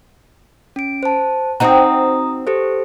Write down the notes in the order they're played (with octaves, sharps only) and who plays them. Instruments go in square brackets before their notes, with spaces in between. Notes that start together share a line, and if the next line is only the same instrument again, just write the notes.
[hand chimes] C#4 D7
C5 A5
[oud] C4 D#4 F#4 [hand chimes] A#5 D#6
[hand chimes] G4 A4 C5